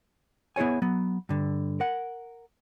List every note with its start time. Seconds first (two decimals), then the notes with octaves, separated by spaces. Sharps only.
0.56 B3 E4 G#4 C#5 G#5
0.82 F#3 B3
1.29 G2 D3
1.80 A#4 F#5